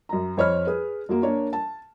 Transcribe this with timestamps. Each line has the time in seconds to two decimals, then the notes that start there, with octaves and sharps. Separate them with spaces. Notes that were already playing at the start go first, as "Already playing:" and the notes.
0.09 F#2 A#5
0.37 F2 C5 C#5 D#5 B5 F6
0.67 G#4 B4
1.09 F#2 F#3 A#3
1.23 A#3 D4 C#5
1.53 A5